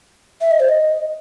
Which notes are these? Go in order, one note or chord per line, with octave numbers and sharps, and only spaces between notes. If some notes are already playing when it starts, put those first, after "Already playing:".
E5
D#5
C5
D#5